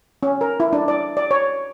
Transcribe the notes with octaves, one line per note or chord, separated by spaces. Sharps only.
C#4
A#4
E4
D4
D5
D5
C#5